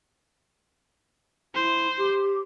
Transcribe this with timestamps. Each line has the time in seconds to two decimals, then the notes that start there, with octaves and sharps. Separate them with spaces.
1.55 E4 C5
1.97 G4